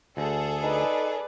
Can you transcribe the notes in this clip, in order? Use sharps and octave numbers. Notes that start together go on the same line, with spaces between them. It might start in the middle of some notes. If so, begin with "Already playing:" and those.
D2 G#4 A4
D#4 B4 D5